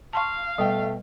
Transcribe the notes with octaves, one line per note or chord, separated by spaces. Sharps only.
F5 A5 C6 C#6
B2 G3 A3 B3 G5